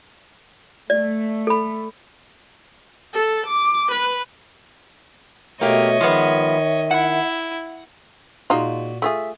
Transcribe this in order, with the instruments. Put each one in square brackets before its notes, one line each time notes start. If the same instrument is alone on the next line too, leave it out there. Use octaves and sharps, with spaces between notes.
[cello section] A3 [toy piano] D5
[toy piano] A4 B5
[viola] A4
D6
B4
[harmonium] B2 A3 [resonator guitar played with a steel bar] A#3 G4 [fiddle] C#5 D#5 [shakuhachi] E5
[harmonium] D#3 [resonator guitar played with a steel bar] F3 G#3 B3
[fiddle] E4 [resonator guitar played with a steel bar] F#5
[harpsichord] A#2 F#4 [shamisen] G#3 D#4 F4
[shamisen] A3 F4 G#4 [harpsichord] E5